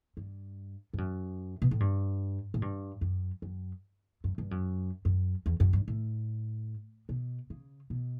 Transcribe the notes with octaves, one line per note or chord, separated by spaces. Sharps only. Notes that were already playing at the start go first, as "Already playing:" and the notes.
G2
G2
F#2
B2
A2
G2
A2
G2
F#2
F#2
F#2
G2
F#2
F#2
E2
F#2
G2
A2
B2
C#3
B2